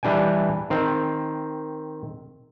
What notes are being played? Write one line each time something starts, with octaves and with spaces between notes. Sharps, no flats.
E3 G3 D4 G5 G#5
D#3 C4